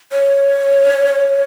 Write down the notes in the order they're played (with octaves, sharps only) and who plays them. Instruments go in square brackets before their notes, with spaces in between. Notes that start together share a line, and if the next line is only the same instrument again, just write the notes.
[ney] C#5